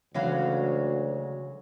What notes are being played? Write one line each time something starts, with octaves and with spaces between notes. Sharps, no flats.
D2 C#3 E3 F#3 G#3 C#4 F5